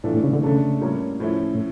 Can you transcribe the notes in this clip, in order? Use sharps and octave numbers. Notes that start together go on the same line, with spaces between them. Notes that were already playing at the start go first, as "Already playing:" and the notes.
A2 E3 A3 D4 F4
A2
C#3
D3
C#3 A3 D4 A4
A2 G3 A#3 C#4 F4
A2 F3 C#4 E4
A2